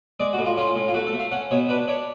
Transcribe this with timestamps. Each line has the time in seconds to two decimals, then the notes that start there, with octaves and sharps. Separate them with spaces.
0.20 G#3 D5
0.33 F#4
0.38 A2
0.45 F4
0.57 C#4 F4
0.75 A2
0.88 F4
0.94 A3 F#4
1.07 A4
1.13 A3
1.19 F5
1.31 C#4 F#5
1.51 B2 C#5
1.69 D4 B4
1.88 D4 C#5